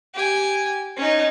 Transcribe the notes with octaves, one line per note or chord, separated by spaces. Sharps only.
G4 G#5
C#4 D#4